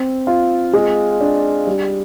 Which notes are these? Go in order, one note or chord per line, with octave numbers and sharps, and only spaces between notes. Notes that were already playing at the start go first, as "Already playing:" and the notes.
Already playing: C4
F4
G#3
D4
G3